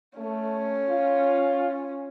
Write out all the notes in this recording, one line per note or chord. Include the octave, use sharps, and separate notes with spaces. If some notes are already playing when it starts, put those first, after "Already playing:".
A3 C#4
F4